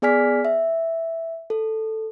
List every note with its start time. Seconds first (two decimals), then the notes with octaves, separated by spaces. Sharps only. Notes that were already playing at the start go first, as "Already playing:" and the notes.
0.02 B3 G#4 D5 G#5 F6 B6
0.45 E5
1.50 A4